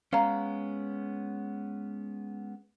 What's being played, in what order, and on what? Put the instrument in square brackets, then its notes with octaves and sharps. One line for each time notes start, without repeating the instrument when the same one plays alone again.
[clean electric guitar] G#3 B3 C#4 [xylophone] F5 A#5